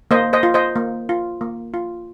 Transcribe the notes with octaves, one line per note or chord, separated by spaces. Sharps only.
A#3 C5 D#5
C5 D#5
F4
C5 D#5
A#3
F4
A#3
F4